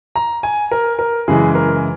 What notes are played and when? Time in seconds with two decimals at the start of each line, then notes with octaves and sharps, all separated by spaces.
0.16 A#5
0.43 G#5
0.71 A#4
0.99 A#4
1.27 F#2 C#3 E3 G#3 G#4
1.55 A#4